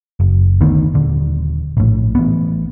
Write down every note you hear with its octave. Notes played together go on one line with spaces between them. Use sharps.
F#1
D2 D3 D#3 B3
D#1 D3
A#1 A2
A1 B3